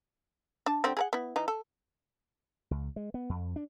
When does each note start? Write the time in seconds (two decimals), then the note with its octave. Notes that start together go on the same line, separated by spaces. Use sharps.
0.66 D4 A5
0.84 D3 G3 C4
0.97 G#4 A#4 F#5
1.13 B3 E4
1.36 E3 D#4
1.48 A4
2.71 C#2
2.96 G#3
3.14 B3
3.29 F2
3.56 D4